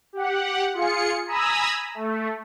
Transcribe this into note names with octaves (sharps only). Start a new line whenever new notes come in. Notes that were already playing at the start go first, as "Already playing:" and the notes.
G4 F#5
F4 G#4 C#7
G#5 A#5 B5 D#6 E6
A3